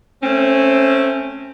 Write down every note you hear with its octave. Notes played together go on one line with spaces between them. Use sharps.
A3 C4 C#4